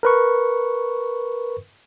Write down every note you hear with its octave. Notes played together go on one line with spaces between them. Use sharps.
A#4 B4 C#6